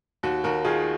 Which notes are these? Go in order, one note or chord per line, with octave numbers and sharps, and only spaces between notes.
D#2 F#4
D#2 F#4 A#4
D#3 F4 G#4